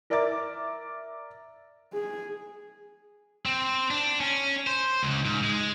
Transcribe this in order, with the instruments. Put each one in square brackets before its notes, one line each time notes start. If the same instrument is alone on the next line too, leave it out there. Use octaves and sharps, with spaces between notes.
[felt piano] A#4 D5 E5 A#5 D6 A6
[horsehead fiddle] G#4
[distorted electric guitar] C4
D4
C#4
C5
C#2
G#2
G#3